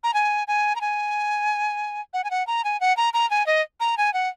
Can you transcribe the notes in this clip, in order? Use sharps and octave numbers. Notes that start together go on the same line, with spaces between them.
A#5
G#5
G#5
A#5
G#5
F#5
G#5
F#5
A#5
G#5
F#5
A#5
A#5
G#5
D#5
A#5
G#5
F#5